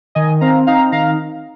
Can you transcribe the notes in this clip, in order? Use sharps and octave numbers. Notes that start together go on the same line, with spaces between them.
D#3 D#5 G#5
C4 F5 A#5
D#4 F5 A#5
D#3 F5 A#5